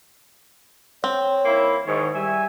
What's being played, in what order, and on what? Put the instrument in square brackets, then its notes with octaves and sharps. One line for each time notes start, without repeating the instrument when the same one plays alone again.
[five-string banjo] C4 [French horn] C#5
[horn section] D#3 A#3 E4
[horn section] G#2 C#5 [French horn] D#3
[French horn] G3 [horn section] E5 G#5